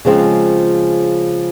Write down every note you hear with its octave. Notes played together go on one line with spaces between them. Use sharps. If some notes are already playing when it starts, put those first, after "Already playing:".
C#3 F3 G#3 C4